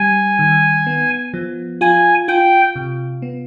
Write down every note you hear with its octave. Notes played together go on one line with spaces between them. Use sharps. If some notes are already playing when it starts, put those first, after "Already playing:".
Already playing: G3 G#5
D#3
B3
F3
F4 G#5
F4 G5
C3
B3